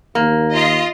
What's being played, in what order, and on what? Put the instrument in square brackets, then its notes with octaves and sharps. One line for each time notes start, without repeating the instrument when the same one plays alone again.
[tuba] D#2 [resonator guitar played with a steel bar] A#3
[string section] F4 D#5